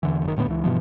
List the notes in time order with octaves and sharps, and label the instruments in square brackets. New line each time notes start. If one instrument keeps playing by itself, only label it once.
[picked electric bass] E2 D3 E3
F#1 D#3
E1 A2 D3 B3
C#2 E3
G2 B2 E3 F3